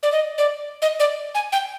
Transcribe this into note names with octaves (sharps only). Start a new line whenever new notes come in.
D5
D#5
D5
D#5
D5
G#5
G5